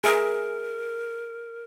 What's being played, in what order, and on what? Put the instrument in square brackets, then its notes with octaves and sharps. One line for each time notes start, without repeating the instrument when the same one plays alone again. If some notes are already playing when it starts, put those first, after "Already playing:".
[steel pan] G#4 E5 A#5 [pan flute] A#4